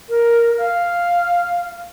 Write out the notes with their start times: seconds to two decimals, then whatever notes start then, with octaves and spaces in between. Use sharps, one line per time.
0.09 A#4
0.58 F5